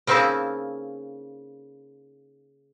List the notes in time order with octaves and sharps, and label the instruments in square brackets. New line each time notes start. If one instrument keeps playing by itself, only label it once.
[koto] C#3 A#3 C4 D#4 E4 A5